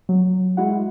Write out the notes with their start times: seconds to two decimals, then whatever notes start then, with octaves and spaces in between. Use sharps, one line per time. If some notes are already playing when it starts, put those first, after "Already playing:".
0.09 F#3
0.57 G#3 E4 F#4 F#5